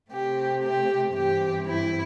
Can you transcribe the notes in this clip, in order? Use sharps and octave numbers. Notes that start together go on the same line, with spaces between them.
C3 A3 C4 G4
G4
G2 E3 C4 G4
E4